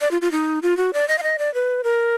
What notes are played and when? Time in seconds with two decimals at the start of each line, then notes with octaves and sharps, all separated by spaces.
0.01 D5
0.11 F4
0.21 F4
0.31 D#4
0.62 F4
0.77 F#4
0.93 D5
1.08 D#5
1.18 F5
1.23 D#5
1.38 D5
1.54 B4
1.84 A#4